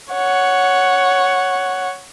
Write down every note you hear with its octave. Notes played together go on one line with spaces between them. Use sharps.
C#5 F#5